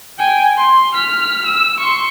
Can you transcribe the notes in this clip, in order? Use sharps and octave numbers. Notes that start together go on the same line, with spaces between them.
G5 G#5
C6
F6 B6
E6
C6 C#6